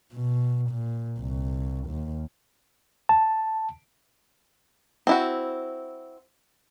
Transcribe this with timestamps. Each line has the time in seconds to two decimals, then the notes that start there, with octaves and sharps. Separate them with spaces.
0.14 B2
0.71 A#2
1.20 C2
1.88 D#2
3.09 A5
5.07 C4 E4 F#4